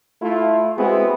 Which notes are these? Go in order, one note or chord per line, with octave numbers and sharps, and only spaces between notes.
A3 E4 F4
G#3 B3 C4 E4 F#4 G#4